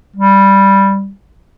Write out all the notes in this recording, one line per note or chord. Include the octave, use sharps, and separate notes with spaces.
G3